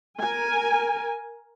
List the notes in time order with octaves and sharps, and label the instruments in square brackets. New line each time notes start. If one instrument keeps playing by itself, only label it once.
[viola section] A#4 G#5